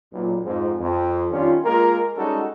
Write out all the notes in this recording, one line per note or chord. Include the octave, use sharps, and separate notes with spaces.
B1 A#2
F2 G#2 F3
F2
D#3 G3 C#4 D4 F4
G#3 A#3 F4 A#4
G3 G#3 C#4 D#4 F#4 A4